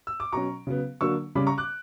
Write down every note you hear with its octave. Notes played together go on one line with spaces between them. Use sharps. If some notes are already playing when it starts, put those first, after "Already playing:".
E6
D6
B2 F#3 C#4 A#5 C#6
C#3 F#3 B3
D3 F#3 A#3 D4 C#6 E6
C#3 G3 C#4 B5 D6
A#5 C#6
D6 F#6